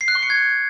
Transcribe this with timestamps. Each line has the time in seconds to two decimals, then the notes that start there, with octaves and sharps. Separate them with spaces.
0.01 C7
0.08 F#6
0.15 C#6
0.23 C#7
0.30 G#6